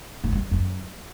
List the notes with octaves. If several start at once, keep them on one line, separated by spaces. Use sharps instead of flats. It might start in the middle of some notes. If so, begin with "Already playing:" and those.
A2
G2
F#2